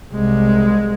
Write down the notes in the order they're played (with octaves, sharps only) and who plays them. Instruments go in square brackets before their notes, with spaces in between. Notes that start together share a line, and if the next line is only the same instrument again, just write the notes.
[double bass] C2 G#3